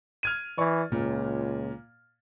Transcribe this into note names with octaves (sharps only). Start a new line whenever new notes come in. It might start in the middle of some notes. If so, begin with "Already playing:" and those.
F6 G#6 D#7
E3 D5 C#6
C#2 A#2